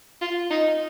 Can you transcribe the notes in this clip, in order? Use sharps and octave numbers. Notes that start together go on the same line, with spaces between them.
F4
D#4